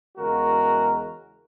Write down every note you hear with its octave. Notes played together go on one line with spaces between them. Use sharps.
E2 C#3 G#3 F#4 A#4